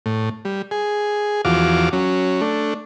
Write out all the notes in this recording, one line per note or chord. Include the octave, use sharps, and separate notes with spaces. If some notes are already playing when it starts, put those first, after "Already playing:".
A2
G3
G#4
E2 F3 F#4 F5 D6
F#3 C#4
A3 D4